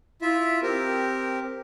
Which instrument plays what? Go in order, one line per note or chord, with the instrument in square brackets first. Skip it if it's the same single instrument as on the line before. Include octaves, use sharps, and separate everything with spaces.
[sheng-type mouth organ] E4 F4 E5
C4 G4 A#4